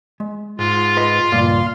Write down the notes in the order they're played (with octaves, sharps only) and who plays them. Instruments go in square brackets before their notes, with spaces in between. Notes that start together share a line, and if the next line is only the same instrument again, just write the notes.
[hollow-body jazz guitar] G#3
[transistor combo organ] G#2 [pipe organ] F4
[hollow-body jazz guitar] B4 D#5 C6
[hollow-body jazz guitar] C#2 G2 A#2 [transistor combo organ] F5 C6